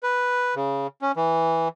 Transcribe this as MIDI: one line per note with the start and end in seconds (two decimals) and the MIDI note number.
0.03 0.55 71
0.56 0.87 49
1.02 1.12 61
1.16 1.68 52